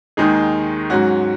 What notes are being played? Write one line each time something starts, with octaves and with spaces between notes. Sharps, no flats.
D#2 D#3 G#3 D#4 G#4
G#2 F#3 C#4 F#4